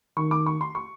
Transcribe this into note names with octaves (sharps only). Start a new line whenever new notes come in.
D#3 C#6
D6
C#6
C6
C#6